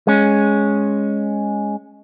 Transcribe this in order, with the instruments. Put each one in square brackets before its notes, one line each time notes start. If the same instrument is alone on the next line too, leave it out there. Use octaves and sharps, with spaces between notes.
[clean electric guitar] G#3 C#4